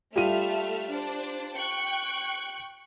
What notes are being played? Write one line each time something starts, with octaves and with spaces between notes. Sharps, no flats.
G3 A3 F4 E5 F6 D#7
D4 C5
G5 C#6 F#6